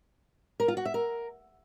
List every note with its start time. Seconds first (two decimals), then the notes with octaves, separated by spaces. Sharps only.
0.60 A#4
0.68 F4
0.77 F#4
0.85 E5
0.94 A#4